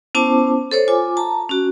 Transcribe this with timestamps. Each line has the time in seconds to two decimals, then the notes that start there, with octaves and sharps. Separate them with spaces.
0.15 B3 C#4 E4 C5 A5 D6
0.71 A4 C5 C#5
0.88 F4 G#5 D6
1.17 A5 A#5
1.49 C#4 F#4